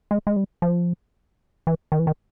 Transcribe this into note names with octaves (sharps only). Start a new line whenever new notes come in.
G#3
G#3
G3
F3
E3
D#3
E3
D#3